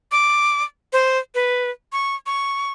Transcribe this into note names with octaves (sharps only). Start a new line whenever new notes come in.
D6
C5
B4
C#6
C#6